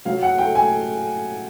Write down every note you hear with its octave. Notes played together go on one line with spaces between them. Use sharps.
F#3 F5
F#5
A3 G5
G#5